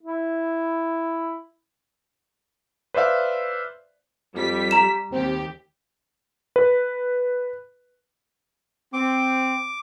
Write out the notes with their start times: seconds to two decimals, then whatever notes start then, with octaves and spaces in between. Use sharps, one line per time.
0.03 E4
2.94 B4 C5 D5 E5 F5
4.35 F2 G3 B6
4.71 A#5 E7
5.12 D#2 C4 G4
6.56 B4
8.93 C4 D6